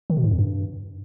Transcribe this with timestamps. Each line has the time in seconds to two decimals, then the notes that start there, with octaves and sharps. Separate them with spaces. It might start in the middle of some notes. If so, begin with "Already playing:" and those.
0.10 D#3
0.17 B2
0.24 G#2
0.31 F2
0.39 G2